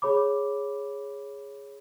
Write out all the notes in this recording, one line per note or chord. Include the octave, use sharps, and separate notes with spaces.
G#4 C#5 B5 D6